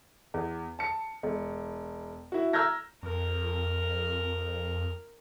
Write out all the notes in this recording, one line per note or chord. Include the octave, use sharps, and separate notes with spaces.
E2
A5 C#7
E1
E4 F#4
A#5 E6 F6 G6 G#6 A#6
F2 A#4